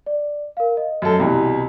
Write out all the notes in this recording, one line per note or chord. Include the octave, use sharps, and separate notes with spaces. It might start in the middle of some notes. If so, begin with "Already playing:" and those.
D5
A#4 F5
D#5
F#2 A4
C2 B2 E3 G4 A#5